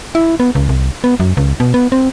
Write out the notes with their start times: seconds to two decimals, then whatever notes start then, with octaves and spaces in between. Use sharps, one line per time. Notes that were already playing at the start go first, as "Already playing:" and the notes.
0.15 E4
0.40 B3
0.55 C#2
0.69 C2
1.04 B3
1.20 F#2
1.37 C#2
1.60 B2
1.74 B3
1.92 C4